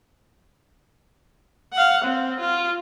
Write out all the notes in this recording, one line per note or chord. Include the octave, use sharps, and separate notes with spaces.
F5 F#5
C4
F4